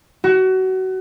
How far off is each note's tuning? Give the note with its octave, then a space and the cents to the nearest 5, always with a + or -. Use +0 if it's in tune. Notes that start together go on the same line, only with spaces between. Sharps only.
F#4 +25